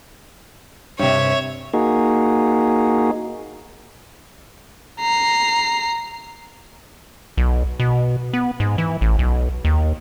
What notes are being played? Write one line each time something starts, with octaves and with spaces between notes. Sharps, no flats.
G2 C3 C#5 E5
A#3 D#4 F#4 G#4
A#5 C7
B1
B2
B3
G#2
E3
A1
B1
D#2